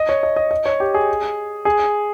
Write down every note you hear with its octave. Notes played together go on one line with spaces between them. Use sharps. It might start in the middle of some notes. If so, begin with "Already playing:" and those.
Already playing: D#5
C#5
D#5
D#5
D#5
C#5
G4
G#4
G#4